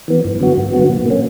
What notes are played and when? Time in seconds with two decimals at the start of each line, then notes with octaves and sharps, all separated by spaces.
0.08 E3 B3
0.24 G2
0.40 D3 F#3 B3 F#4
0.57 G2
0.73 D3 F#3 B3 F#4
0.89 A#2
1.06 A#3 C#4